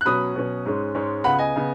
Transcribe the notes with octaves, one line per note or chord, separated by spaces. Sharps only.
F#6
B2 F#3 C#4 B5 D#6
B2 F#3 C#4
G#2 G#3 C#4
G#2 G#3 C#4
C#2 C#3 B3 F#5 B5
D#5 G#5
C#3 B3